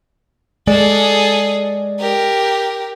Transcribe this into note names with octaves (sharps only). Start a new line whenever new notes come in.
G#3 G#4 A4 D5
G4 A#4